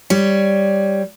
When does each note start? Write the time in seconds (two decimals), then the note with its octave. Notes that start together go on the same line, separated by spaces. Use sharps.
0.10 G3 C#5